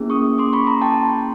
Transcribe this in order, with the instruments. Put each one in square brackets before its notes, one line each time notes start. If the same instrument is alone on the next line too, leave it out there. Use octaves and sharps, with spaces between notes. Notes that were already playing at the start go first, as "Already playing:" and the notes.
Already playing: [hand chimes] A#3 C#4 E4 G#4
C#6 D#6
C6 D6
B5 C#6
A#5 C6
G5 A5